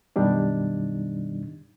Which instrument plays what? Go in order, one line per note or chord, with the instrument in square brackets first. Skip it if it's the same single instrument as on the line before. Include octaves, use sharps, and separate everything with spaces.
[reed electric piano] F#2 B2 D#3 G3 D4 D#4